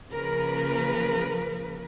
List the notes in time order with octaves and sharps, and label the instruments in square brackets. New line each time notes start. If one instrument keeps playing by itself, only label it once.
[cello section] C#3 F3 A#3 A#4 B4